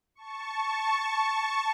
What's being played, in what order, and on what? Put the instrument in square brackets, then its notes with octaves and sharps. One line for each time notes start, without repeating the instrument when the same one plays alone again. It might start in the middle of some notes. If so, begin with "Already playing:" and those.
[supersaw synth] A5 C#6